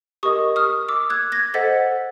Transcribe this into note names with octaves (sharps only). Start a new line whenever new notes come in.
G4 A#4 D#5 C#6 D#6
D#6 F6
D6 E6
F#6 G#6
G#6 A#6
A4 C5 D#5 F#5 A6 B6